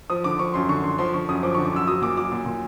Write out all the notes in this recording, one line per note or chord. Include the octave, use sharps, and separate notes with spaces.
F3 D#6
D3 D6
F3 C#6
F#2 C6
D3 C#6
D3 C6
F3 C6
D3 C#6
F#2 D#6
F3 D6
D3 C#6
D6
F#2 E6
F#3 D#6
A#2 D6
F#3 D6
A#2
A#2